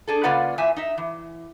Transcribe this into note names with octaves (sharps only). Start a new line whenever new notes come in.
D4 G#4 A4
C#3 A#3 F4 B4 D5 F#5
E2 A#2 E3 E5 G#5
D#4 E5
E3